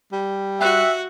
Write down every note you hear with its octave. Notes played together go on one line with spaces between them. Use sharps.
G3
F#4 E5 G5 F#6